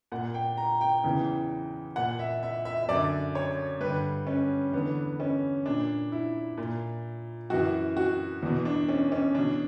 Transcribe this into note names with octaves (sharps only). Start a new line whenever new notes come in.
A#2 F#5
G5
A#5
G5
E2 C#3 E3
A#2 F#5
E5
E5
E5
E5
F#2 D3 D5
C#5
G2 D3 B4
C#4
E2 D3 B3
C#4
A#2 D4
E4
A#2
F#2 E3 F#4
F#4
E2 B2
D4
C#4
C#4
E2 B2 D4